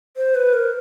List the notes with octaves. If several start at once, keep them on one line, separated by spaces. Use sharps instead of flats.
C5
B4
A#4